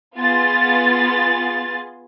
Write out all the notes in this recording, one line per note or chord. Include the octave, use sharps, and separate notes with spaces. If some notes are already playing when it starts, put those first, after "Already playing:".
B3 F4 G#4 C6 A6